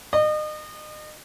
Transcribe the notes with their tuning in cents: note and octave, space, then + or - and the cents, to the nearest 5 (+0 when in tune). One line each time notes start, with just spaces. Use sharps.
D#5 -35